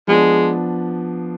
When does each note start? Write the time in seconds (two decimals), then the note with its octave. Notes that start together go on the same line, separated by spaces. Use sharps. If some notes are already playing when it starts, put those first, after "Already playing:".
0.08 F3 G#3 B3 D4